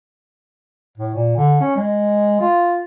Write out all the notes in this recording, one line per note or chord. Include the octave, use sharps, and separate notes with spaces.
A2
A#2
D3
C#4
G#3
F4